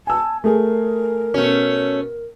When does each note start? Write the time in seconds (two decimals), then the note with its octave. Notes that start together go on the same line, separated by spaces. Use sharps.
0.07 G#5 A5 E6
0.44 A3 G#4 A#4
1.34 B2 A3 C#4